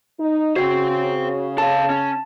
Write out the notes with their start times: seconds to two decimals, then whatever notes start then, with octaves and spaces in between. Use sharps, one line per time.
0.19 D#4
0.56 C#3 F#4 C5 G5
1.58 A4 F5 A5
1.90 C#4